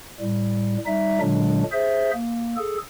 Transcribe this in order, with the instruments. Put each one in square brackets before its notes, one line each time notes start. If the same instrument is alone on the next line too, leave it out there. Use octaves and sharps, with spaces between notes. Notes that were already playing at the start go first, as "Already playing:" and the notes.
[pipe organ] A2 G3
G3 D#4 E5
A#2 D3 F#3 G#3 D4
G#4 C5 E5
A#3
G#4 A4